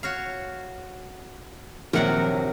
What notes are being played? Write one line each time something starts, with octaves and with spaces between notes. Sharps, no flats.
F#4 C#5 F5
A#1 C3 D#3 F#3 A#4 F#5